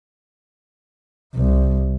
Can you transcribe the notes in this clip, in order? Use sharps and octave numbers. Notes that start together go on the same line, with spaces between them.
C2